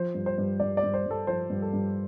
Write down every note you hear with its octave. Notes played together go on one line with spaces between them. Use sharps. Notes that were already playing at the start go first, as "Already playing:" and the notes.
Already playing: F3 C5
G2
C5
G2
G2 D5
D5
G2
C5
G2 A4
F3 C5
G2
A4
G2